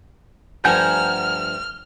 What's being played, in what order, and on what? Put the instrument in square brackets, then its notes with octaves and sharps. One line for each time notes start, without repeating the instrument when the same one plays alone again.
[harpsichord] G2 F3 A3 [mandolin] F#5 G#5 A#5 [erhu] F6 [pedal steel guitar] G6